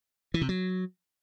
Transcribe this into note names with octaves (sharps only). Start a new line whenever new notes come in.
E3
C3
F#3